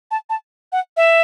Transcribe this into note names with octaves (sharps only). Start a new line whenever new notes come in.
A5
A5
F#5
E5